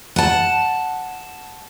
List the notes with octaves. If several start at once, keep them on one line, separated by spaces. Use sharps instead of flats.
F#5 A5